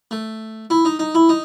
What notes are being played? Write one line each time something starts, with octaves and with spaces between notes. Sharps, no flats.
A3
E4
D#4
D#4
E4
D#4